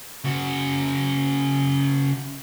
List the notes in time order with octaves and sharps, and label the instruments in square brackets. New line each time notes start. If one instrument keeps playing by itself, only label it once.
[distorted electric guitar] C#3 F#4